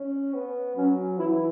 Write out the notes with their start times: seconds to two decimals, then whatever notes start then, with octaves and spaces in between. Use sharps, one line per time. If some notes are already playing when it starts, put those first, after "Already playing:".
Already playing: C#4
0.34 B3
0.76 F#3 C#4
1.18 E3 E4